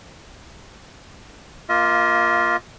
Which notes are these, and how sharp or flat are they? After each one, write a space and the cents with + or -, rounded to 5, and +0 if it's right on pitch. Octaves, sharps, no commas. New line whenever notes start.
A#3 +10 F4 +0 D#5 +40